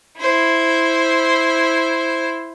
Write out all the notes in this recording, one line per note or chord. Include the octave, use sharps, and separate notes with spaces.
E4 C5